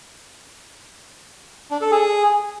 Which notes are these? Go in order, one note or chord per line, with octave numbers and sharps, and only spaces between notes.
D4
A4
G#4